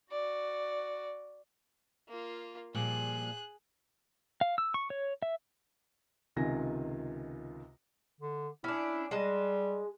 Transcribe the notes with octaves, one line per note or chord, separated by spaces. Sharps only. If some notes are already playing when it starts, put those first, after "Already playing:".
F#4 D5
A#3 F4
A#2 F3 G3 G#4 F#6
F5
E6
C#6
C#5
E5
C#2 C3 D#3 F4 G#5 A#6
D3
C#4 D4 E4
G3 G#3 D#5 A5